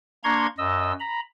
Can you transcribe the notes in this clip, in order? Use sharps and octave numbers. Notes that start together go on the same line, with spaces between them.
A#3 D4 A#5 C6 C#6 G#6
F#2 D#5 E6
A#5 B5